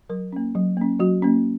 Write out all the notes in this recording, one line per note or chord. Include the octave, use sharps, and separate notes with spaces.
F#3 A#4
A#3 C#4
F#3
A#3 C#4
F#3 F#4
A#3 C#4